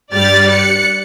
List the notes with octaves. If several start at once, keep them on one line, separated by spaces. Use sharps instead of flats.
G2 G3 G4 D5 F6 A6
F#6 C#7